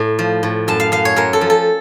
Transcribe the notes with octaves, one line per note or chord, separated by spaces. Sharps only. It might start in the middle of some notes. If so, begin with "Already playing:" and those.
Already playing: A2
F3
A2
F#2 A5
F5
F#2 F5
C#5
F#2 A#4
A4
F3
A4